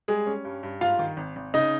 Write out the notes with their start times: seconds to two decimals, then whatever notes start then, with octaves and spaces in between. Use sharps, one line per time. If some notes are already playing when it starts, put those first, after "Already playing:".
0.08 G3 G#3 G#4
0.27 C#4
0.45 G2
0.63 G2
0.81 G#2 F4 F5
0.99 D#3
1.17 G#1
1.36 G#1
1.54 C#3 D#4 D#5